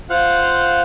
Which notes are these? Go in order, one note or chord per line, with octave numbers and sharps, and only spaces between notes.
F4 C5 F5 F#5